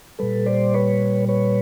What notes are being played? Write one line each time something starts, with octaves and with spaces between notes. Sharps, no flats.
A#2 G3 A4 B4
C5 D5
B4 C#5
B4 C#5